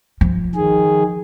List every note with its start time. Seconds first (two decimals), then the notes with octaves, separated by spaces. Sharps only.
0.21 F3
0.55 D#3 G#4